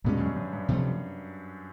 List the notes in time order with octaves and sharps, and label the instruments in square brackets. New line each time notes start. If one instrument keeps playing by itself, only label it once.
[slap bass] E2 B2 G#3 C#4 [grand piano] G2
[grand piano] F#2
F#2
G2
[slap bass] C3 F3 A3